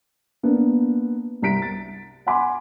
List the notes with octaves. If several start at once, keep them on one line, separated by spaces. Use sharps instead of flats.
A#3 B3 D4
C2 A#5 B6 D7
A6
F#5 G#5 B5 C6 D6